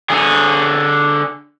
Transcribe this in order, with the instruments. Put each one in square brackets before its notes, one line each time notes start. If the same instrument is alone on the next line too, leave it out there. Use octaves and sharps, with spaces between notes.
[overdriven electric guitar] D3 G#4